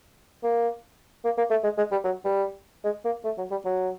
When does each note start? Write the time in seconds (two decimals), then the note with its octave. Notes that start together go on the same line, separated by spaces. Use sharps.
0.43 A#3
1.24 A#3
1.37 A#3
1.50 A3
1.63 G#3
1.77 G#3
1.91 G3
2.04 F#3
2.25 G3
2.84 G#3
3.04 A#3
3.24 A3
3.38 F#3
3.51 G3
3.65 F#3